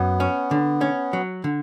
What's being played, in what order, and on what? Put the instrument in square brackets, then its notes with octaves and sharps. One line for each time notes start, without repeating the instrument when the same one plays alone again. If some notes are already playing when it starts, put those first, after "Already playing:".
Already playing: [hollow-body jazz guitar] F#2 [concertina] B3
[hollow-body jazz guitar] C#4
D3
C#4
F#3
D3